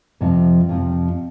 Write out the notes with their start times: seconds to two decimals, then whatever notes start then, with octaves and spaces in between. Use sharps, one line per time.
0.21 F2 C3 F3
0.69 F2 C3 F3